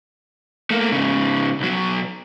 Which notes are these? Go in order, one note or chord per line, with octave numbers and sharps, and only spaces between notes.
A3 A#3
G#2 C#3
B1 F#3